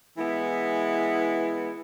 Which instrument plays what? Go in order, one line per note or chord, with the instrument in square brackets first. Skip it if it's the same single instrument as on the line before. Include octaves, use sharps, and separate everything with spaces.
[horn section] E3 G#3 B3 E4